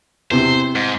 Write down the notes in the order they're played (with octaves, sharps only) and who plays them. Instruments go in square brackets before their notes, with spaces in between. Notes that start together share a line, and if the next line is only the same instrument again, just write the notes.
[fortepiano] E2 C3 [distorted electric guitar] C5
[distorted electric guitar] G#2